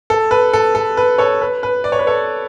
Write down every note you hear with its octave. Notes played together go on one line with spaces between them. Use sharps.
A4
B4
A4
A4
B4
A4 C#5
B4
B4
D5
C#5
B4
A4 C#5